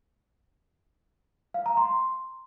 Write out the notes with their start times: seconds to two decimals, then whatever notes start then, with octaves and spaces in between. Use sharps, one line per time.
1.54 F5
1.66 A#5
1.77 C6